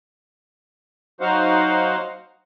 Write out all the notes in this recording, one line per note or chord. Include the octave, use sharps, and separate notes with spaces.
F#3 D#4 F#4 C5 F5 F#5